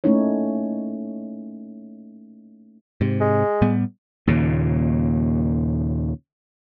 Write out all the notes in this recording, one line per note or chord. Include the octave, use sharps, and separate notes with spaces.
A3 A#3 C#4 D#4 E4 C#5
G#2 C3
G#3
A2 G3 B3
D#2 A#2 C#3